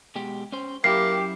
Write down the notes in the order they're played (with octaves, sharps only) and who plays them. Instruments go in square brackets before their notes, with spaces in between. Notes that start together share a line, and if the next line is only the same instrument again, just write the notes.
[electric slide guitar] B2 G#3 G4
C#4 C5
[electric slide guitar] F#2 E4 [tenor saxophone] A#3 [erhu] G4 [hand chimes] C7